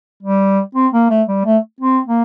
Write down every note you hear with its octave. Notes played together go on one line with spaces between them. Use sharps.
G3
C4
A#3
A3
G3
A3
C4
A#3